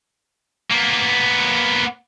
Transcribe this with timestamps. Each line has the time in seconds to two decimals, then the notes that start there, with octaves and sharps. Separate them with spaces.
0.70 A#3 B3